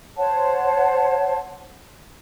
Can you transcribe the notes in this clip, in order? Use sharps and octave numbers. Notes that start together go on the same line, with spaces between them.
C5 C#5 F#5 A5